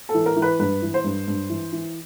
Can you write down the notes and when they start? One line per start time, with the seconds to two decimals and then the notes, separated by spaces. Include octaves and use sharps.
0.09 A4
0.14 E3
0.26 A#4
0.36 E3
0.42 B4
0.59 G2 B4
0.82 E3
0.94 C5
1.04 G2
1.28 G2
1.50 E3
1.73 E3